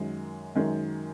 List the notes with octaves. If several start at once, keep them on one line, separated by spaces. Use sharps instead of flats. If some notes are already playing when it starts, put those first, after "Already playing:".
Already playing: F#2 D#3 G#3
F#2 D#3 G#3